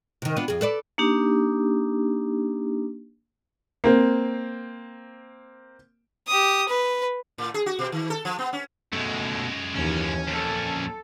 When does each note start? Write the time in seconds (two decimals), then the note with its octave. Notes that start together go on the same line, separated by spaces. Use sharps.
0.22 C3 D#3
0.36 B3 D4 F4
0.48 F2 G#4
0.61 A4 B4 D5
0.98 A#3 D4 D#4 G4
3.84 A#3 C4
6.28 G4 D#6
6.68 B4
7.38 A2
7.54 G#4
7.66 F#4
7.79 B2
7.92 D#3
8.10 A4
8.25 F3
8.39 B3
8.53 C#4
8.93 F#2 B2 G#3 A3
9.76 D#2 E3 C#4
10.27 F2 A#2 A4